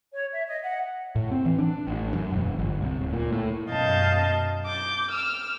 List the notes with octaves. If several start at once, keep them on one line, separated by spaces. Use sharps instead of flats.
C#5
E5
D#5
F#5
A2
C4
E3
D4
A1
F#2
E1
G1
C2
D1
A#2
A2
F#2 B2 D#5 F5 A5 G6
D6 G6
E6 F6